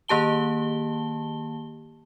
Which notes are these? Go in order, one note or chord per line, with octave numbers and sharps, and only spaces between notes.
D#3 A#3 G4 A5 G7